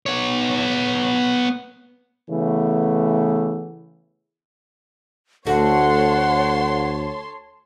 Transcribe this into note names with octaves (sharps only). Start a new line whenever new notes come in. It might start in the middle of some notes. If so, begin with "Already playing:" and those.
B3 C#5
C#3 E3 A3 B3
D2 A3 F#4 C#5 F#5 A5 C6